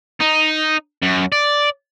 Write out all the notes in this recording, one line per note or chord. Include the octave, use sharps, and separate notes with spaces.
D#4
F#2
D5